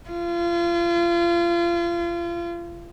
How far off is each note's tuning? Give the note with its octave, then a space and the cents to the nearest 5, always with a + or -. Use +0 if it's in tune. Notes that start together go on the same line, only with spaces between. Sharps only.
F4 -35